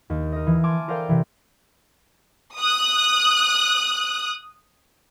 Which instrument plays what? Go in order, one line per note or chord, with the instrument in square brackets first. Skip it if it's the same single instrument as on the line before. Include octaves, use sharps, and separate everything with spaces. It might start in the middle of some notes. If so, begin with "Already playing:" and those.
[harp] D#2
A#4 D#5
E3
G#5 A5 C6 D6 F6
A4 A#4 C5 D5 F5 G5
C3 E3
[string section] D#6 F#6